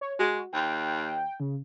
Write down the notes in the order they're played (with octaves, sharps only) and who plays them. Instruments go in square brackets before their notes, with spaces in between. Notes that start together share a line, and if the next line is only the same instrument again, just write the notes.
[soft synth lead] C#5
[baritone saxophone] G#3 [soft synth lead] F#4
[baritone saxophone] D#2 [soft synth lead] G5
[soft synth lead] C#3